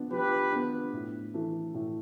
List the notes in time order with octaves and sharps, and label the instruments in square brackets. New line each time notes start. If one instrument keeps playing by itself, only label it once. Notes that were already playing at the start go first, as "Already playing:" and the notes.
Already playing: [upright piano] F3 B3 D4
[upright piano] F3 [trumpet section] G4 B4
[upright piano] B3 D4
A2
E3 A3
A2